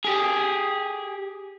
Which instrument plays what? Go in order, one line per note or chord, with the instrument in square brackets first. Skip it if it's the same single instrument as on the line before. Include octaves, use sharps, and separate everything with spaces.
[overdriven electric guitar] G4 G#4